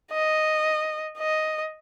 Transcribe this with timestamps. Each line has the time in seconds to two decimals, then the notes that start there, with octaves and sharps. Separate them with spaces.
0.12 D#5
1.18 D#5